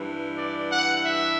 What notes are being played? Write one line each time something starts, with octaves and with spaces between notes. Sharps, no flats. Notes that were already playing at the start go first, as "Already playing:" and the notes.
Already playing: G2 E3
D5
F#5
E5